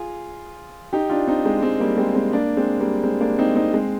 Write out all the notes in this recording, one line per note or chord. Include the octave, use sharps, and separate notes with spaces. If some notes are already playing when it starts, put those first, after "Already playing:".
Already playing: F4 G#4
D#4 G4
D4 F4
C4 D#4
G#3 C4
G#3 C4
G3 A#3
G#3 C4
G#3 C4
A#3 D4
G#3 C4
G3 A#3
G#3 C4
A#3 D4
C4 D#4
C4 D#4
G#3 C4